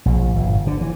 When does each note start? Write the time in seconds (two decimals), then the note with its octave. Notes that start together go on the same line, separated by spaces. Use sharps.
0.06 A#1
0.35 G1
0.67 D3
0.81 E3